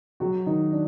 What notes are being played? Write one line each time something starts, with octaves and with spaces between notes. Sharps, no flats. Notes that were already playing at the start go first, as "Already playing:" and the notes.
F#3 F#4
D#3 D#4
D4